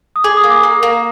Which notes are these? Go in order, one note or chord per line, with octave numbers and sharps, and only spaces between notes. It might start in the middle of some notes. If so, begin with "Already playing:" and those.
D#6
G#4 D6
D#6
A#3
D6
A#3
A#3